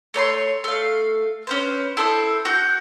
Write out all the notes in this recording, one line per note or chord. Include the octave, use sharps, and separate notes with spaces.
A3 C#5 B5 C6
A3 F5
C#4 B4 C5
E4 A4 C5 D#6
F#4 F#5 G6